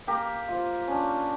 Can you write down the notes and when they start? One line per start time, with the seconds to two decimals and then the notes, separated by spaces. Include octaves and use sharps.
0.07 A#3 G4 A#4
0.48 F4 C5
0.88 C#4 D4